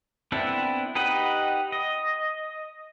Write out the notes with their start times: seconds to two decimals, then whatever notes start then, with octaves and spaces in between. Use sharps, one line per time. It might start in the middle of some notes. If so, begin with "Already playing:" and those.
0.32 B3 C4 D4 E4 A4
0.95 D#4 G4 B4 D#5 F#5
1.72 D#5